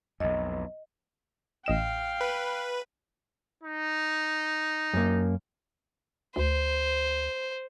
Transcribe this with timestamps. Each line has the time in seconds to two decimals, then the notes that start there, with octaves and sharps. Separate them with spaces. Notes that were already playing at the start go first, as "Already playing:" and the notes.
0.20 B1 F2 D#5
1.66 A1 D#5 F5 G5 E7
2.21 B4
3.63 D#4
4.93 F#2 A#3
6.36 D2 C5